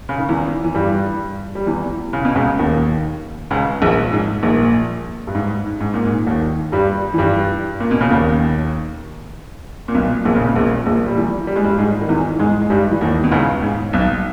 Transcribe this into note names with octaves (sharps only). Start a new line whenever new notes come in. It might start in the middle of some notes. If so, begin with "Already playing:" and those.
C#3
D#3
E2 E3
E3
G2 G3
G3
E2 E3
C#3
B2
C#2 C#3
D#2 D#3
C#2 C#3
A#1 A#2
G#2
A#1 A#2
G2
G#2
G#2
A#2
G#2
D#2 D#3
G2 G3
E3
G2 G3
A#2
B2
C#3
D#2 D#3
A#2
B1 B2
A#1 A#2
C#3
B2
A#1 A#2
A#1 A#2
G3
E2 E3
G3
G#3
G2 G3
G#2 G#3
D#3
E2 E3
G#2 G#3
G#3
G2 G3
E3
D#2 D#3
B2
C#2 C#3
G#2
B1 B2